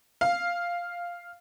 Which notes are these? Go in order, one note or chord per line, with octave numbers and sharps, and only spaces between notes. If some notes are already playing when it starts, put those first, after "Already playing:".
F5